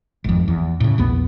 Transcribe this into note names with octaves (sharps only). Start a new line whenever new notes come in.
G#1 F2
E2
A2 C#3
A#1 E2 B3